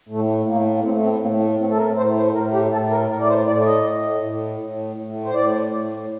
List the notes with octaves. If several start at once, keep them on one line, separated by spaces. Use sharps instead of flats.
A2 A3
A2 A#3
A#3
A2 C4
C4
A2 A#3
A3
A2 C4
A4
A#4
A2 C5
C5
A2 A#4
G4
A2 A4
A#4
A2 A#4
D5
C5
A2 D5
D#5
A2
A2
A2
A2
C5
A2 D5
A2